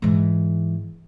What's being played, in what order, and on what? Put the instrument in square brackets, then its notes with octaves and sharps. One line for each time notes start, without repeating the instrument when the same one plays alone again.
[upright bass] G#2 E3